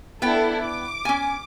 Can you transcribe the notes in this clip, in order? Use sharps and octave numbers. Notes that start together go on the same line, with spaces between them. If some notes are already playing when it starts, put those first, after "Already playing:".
B3 D4 E4 A4 G5
D6
C#4 G#5